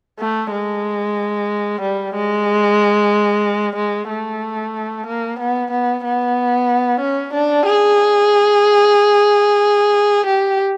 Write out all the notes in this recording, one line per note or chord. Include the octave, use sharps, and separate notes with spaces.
A3
G#3
G3
G#3
G#3
A3
A#3
B3
B3
B3
C#4
D4
G#4
G4